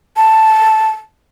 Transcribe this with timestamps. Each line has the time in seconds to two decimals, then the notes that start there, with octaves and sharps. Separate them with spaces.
0.17 A5